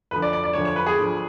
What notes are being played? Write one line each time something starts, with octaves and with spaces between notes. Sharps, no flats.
D2 D3 F3 B4
D5
D5
D5
D2 D3 F3 C#5
C#5
B4
G#4
D2 D3 F3